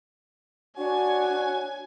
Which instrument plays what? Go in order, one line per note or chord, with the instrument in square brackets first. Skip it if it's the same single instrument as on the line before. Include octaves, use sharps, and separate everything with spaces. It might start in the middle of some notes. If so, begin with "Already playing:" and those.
[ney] D4 [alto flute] F#4 [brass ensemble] C#5 F#5 [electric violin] G#5